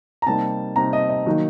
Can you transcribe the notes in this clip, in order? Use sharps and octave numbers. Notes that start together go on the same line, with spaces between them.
A#5
C3 G3 A#3 D#4 A5
C3 G3 A#3 D#4 A#5
D#5
D#5
D#3 F#3 A#3 D#4